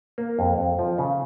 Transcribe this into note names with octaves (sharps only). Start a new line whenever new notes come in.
A#3
F2
F2
F3
C#3